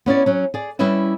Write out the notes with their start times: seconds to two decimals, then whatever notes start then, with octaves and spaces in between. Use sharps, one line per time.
0.06 B3 C#4 E4 D5
0.26 F#3 C#4
0.54 G#4 D5
0.79 G3 C#4 E4 B4 D#5 E5